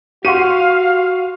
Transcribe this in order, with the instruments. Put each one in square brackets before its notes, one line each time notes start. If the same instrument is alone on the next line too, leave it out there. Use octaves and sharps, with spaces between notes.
[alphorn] F#4 [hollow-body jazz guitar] G4 F#5 [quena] F5 [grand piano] C6 C#6 D#7